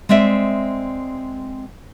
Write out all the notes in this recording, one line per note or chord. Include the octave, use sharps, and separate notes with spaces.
G#3 C4 D5 E5